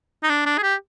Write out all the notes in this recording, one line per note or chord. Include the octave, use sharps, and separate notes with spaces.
D#4
D4
D4
G#4
G4